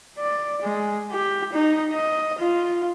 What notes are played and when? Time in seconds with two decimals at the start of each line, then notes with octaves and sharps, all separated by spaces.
0.18 D5
0.62 G#3
1.12 G4
1.53 D#4
1.93 D#5
2.39 F4